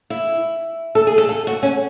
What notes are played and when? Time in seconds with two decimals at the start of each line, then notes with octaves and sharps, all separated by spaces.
0.10 E4
0.95 A4
1.07 G#4
1.18 A4
1.29 A4
1.47 F#4
1.63 C#4